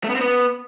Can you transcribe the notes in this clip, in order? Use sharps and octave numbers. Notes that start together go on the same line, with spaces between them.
A3
B3
C4
B3